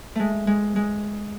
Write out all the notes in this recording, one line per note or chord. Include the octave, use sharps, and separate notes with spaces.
G#3 A3
G#3
G#3